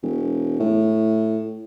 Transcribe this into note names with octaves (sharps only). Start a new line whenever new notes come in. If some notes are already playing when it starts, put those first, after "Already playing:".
E1
A2